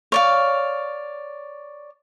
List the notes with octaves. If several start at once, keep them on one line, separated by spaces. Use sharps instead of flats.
C#5 D5 F5